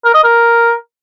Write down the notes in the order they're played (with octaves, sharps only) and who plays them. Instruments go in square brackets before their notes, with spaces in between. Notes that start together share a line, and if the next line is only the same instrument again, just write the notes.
[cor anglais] A#4
D#5
A#4